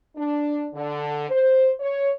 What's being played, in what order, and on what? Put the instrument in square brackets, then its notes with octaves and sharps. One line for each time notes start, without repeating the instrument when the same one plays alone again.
[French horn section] D4
D3
C5
C#5